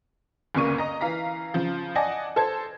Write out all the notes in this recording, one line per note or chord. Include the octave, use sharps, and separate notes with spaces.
G1 D2 C#3 A#3 C#6 D#7
D#5 A#5
E3 F5 A#5 B6
C#3 F3
D5 D#5 F#5 G#5 A5 A#6
A4 C5 A5 G#6